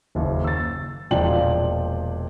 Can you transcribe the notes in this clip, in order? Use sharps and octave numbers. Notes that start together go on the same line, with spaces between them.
F#1 D#2
E6 A6
E1 A#2 F3 D4 G5 F#7